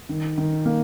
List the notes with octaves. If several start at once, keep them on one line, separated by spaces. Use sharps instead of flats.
D#3
D#3
A#3